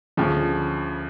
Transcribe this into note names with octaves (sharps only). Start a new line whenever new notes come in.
D2 C#3 F3